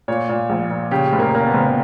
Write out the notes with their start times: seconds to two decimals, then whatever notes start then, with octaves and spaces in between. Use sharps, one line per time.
0.08 A#2 C#5
0.29 A#2
0.50 A#1
0.71 A#2
0.91 C#3 G4
1.13 F#1
1.19 A#3
1.33 C#3 A#3
1.46 B3
1.54 F#1